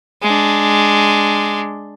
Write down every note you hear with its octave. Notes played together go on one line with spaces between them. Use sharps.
G#3 D4